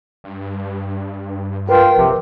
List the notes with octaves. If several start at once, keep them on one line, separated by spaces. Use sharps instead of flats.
G2
F4 A#4 B4 G5
A#1 C3